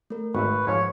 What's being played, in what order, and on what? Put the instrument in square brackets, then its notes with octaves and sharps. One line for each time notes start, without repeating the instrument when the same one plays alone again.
[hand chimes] A3 A#4
[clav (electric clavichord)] G#1 E5 [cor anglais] B4 [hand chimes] C#6
[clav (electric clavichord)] G#2 F3 F4 [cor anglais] C#5